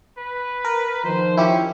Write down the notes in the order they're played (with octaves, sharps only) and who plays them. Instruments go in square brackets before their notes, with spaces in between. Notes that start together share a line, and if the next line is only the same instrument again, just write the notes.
[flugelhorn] B4
[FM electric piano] A#4
[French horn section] D#3 F3 [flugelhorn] C5
[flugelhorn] C#4 [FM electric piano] E4 G4